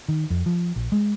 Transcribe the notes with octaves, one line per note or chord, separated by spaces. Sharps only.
D#3
F2
F3
A#1
G#3